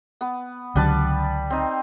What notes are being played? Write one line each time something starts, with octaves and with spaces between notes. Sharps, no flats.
B3
C#2 D3 F#3 G3 B4 A5
C4 D#4